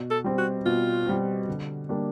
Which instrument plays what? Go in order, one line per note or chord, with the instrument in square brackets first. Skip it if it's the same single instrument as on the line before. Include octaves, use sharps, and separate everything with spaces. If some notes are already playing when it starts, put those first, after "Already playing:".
Already playing: [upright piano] B2
[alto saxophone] A4
[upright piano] G3 C4
[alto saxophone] F#4
[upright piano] B2 [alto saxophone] F4
[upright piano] G3 C4
D3
G3 A#3 D4